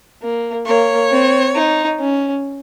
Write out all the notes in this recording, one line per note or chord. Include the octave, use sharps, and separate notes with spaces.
A#3
A#3 C#5
C4
D#4
C#4